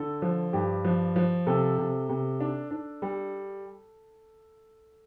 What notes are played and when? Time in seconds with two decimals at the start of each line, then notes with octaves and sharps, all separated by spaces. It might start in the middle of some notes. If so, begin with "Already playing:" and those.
Already playing: D3 A4
0.22 F3
0.53 G2 G4
0.84 F3
1.16 F3
1.47 C3 A4
1.78 C3
2.09 C3
2.40 D4
2.71 D4
3.02 G3